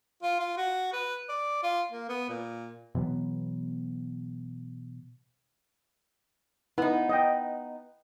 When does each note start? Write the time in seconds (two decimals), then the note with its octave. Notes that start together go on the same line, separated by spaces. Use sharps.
0.23 F4
0.40 F4
0.57 F#4
0.93 B4
1.29 D5
1.63 F4
1.92 A#3
2.09 B3
2.29 A#2
2.95 B2 E3 F#3 B3
6.78 B3 D#4 E4
7.09 D#5 G5